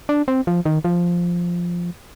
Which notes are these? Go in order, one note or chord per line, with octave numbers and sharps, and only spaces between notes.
D4
C4
F3
D#3
F3